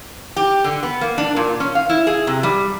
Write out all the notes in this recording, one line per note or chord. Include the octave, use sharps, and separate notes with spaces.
G4
D3
B3
A#3
D4
A#2
C#4
F5
E4
G#4
C3
G3